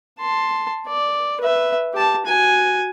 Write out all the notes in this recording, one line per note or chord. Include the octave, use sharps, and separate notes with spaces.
A5 C6
D5
B4 E5
G4 A5
F#4 G#5